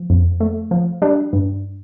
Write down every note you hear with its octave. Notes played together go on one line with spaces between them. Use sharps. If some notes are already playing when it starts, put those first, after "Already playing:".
Already playing: F3
F2
A3
F3
G3 D4
G2